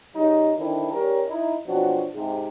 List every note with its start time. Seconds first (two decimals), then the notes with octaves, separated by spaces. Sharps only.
0.15 C#3 G3 C#4 D#4
0.56 D3 D#3 C4 D4 E4
0.91 G3 C#4 A#4
1.27 D#4 E4
1.67 B2 F3 F#3 C4 D4 F#4
2.14 G#2 C3